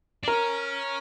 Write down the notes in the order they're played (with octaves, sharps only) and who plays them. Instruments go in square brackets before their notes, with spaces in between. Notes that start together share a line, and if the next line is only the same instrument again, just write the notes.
[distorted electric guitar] D4
[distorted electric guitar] C#4 [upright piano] A#4